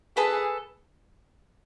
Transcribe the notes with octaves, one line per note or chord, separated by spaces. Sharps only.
G#4 A4 B4